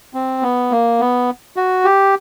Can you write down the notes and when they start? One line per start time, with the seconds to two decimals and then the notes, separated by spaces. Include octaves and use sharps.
0.14 C4
0.43 B3
0.71 A#3
1.00 B3
1.56 F#4
1.85 G4